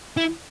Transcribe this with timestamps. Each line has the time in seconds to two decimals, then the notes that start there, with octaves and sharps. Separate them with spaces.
0.17 E4